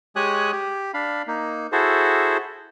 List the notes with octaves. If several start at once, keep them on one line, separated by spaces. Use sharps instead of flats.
G#3 G4 C#5 G#5 D#6 F#6
G4
D4 F5 B5
A#3 D#4
E4 F#4 G#4 A4 C5